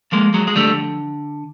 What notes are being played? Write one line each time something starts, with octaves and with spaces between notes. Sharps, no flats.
F3 G#3 A#3
F#3 G#3
G#3
D3 G3 A3